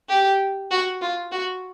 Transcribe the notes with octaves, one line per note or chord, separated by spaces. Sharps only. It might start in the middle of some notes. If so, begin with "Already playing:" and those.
G4
F#4
F4
F#4